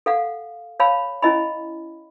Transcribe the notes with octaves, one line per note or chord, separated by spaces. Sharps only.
A4 F5 F#5
C#5 F5 A5 B5
C#4 E4 D#5 G#5 B5